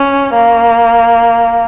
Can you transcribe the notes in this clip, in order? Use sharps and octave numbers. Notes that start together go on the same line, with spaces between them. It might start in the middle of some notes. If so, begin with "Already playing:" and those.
Already playing: C#4
A#3